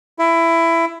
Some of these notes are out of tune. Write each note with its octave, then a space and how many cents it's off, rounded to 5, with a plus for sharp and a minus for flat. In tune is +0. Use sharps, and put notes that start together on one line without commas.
E4 +15